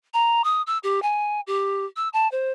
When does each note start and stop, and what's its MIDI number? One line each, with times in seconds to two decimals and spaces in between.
0.14 0.42 82
0.44 0.62 87
0.67 0.78 88
0.83 1.02 67
1.02 1.41 80
1.47 1.85 67
1.96 2.09 88
2.13 2.30 81
2.32 2.52 72